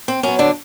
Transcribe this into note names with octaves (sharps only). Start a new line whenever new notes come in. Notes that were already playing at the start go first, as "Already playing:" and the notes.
C4
F#3 B3 C#4
D3 D4